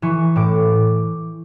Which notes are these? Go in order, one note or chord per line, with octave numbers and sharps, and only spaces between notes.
E3 C#6
A2 D6